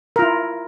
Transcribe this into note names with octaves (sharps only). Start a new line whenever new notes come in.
E4 F4 A#4